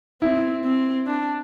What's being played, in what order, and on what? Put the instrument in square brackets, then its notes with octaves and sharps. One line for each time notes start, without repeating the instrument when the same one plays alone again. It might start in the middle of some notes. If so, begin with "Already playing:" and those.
[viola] C4 [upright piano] E4
[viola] C4
D4